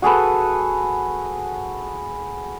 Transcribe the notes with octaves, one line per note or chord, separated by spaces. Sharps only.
F#4 G#4 A4 B4